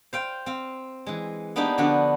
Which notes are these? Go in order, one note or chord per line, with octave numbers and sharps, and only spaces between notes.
C5 F5 G5
C4 F5
E3 G#3
A#3 B3 D4 D#4 G4
D3 F3 B3 D4 F#4